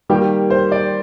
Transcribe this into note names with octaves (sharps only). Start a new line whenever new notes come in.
D#3 G3 A#3 G4
C5
D5